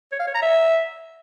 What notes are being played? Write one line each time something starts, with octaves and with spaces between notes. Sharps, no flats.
C#5
F5
C#5
A#5
E5